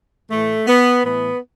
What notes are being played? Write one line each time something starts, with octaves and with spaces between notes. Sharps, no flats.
A2 E3 A3
B3
A2 E3 B3